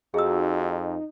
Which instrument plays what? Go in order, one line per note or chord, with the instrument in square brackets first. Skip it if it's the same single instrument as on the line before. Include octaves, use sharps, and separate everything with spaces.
[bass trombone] F2 [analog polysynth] D#4 [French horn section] F#4 [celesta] G#4 E6